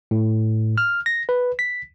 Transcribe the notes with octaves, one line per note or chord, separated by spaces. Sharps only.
A2
F6
A#6
B4
B6